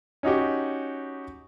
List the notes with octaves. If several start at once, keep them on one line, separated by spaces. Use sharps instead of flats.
C#4 D#4 F#4 G4